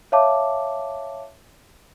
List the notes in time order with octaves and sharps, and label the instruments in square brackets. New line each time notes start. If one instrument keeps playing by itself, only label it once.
[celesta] C#5 E5 F5 A5 D6